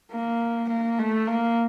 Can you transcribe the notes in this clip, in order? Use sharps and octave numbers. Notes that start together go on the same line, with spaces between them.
A#3
A#3
A3
A#3